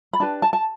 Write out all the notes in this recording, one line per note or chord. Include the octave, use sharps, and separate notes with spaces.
B5
D4 G4 B4 A5
A5
A5